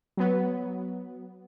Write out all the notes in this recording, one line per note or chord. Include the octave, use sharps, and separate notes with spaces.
F#3 B3